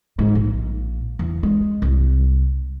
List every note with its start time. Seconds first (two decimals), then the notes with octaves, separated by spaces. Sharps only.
0.19 G#2
0.35 A#1
1.19 E2
1.43 G#3
1.82 C2